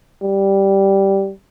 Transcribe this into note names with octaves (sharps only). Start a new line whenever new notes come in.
G3